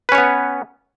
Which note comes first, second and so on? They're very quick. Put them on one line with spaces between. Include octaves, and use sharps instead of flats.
B4 C#4 C#5 B3